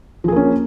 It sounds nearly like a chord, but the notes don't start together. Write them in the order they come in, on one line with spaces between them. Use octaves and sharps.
F3 G#4 A#3 C#4